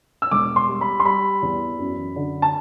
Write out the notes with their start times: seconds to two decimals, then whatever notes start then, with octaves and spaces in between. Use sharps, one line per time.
0.22 E6
0.31 E1 D6
0.56 C6
0.68 G3
0.81 B5
1.00 C6
1.05 G3 B5
1.42 E2
1.79 F#2
2.16 D3
2.42 A5